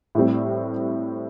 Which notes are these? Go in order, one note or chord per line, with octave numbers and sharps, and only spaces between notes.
A2 G3 C4